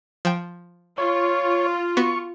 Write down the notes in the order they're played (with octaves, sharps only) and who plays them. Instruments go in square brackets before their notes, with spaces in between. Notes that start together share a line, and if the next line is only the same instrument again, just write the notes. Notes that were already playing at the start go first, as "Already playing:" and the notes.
[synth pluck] F3 G5
[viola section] F4 [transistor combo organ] C#5
[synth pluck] B3 F#4 [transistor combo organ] C#6